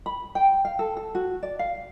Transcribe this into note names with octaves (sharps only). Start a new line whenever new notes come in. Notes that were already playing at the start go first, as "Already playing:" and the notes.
B5
G5
F5
A4
A4
F#4
D5
F5